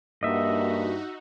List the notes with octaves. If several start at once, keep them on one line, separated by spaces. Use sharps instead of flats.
G2 A#3 D#4 F#4 D#5 E5